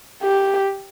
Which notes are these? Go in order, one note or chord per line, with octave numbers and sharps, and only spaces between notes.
G4